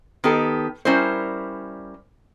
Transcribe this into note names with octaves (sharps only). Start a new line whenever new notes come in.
D#3 B3 G4 A4
G3 C#4 E4 A#4 C5